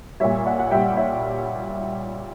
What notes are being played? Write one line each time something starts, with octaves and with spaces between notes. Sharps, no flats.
A#2 G3 C#5 E5
D5 F#5
F#5
A#2 G3 E5 G5
C#5 E5